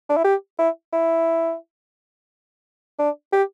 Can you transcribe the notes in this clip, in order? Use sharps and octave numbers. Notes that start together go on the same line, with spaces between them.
D4
E4
G4
E4
E4
D4
G4